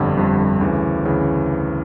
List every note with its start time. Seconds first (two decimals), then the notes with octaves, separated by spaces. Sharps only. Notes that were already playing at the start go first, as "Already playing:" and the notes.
Already playing: G1 F2 D3 G3
0.16 G1 F2 D3 G3
0.61 D2 C#3 E3
1.05 D2 C#3 E3